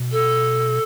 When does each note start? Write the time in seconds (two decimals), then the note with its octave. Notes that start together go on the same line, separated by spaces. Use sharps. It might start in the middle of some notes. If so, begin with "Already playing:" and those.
Already playing: B2
0.12 A4